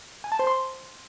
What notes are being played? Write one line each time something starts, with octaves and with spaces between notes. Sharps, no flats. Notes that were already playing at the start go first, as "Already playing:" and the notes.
G#5
A5
C5
C6